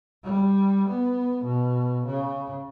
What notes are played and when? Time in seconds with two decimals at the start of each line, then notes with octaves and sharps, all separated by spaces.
0.24 G3
0.89 B3
1.44 B2
2.06 C#3